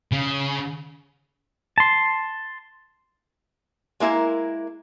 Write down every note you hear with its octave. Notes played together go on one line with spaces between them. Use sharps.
C#3
A5 C6
G#3 A#3 E4 A#4